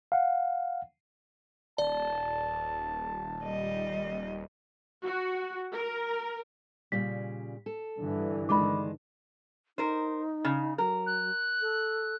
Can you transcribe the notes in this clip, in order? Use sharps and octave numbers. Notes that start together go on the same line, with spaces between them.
F5 F#5
D#1 D5 A5
G3 D#5
F#4
A#4
A#2 C#3 G3 B6
A4
G2 D3 E3
D#3 G#3 D4 B5 D6
D#4 A#4 C5
C#3
F#3 A#4
F#6
A4